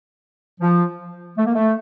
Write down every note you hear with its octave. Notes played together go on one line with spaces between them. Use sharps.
F3
A3
A#3
A3